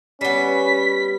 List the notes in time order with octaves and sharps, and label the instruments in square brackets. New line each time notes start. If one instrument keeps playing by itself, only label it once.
[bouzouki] G3 B3 [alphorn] C#4 [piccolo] B6